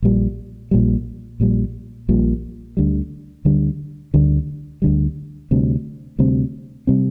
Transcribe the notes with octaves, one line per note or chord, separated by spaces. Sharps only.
A#1 A#2 G3
A#1 A#2 G3
A#1 A#2 G3
A#1 A#2 G3
D2 D3 G3
D2 D3 G3
D2 D3 G3
D2 D3 G3
D2 C3 G3 C4
D2 C3 G3 C4
C3 G3 C4